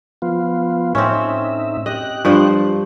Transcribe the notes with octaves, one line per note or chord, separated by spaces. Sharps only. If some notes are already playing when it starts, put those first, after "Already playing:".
F3 B3 F4
A2 C4 C#4 D#4 E5
G4 D#5 F#6
G2 F3 C5